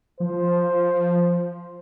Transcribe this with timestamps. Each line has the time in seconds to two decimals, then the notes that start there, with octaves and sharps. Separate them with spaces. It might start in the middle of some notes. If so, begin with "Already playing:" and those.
0.20 F3 C5